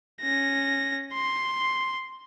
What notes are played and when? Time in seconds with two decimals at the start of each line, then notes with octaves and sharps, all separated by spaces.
0.21 C#4 A#6
1.13 C6